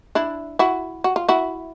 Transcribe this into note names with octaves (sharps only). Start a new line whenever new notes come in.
D4 E4
E4 F#4
F#4
F4
E4 F#4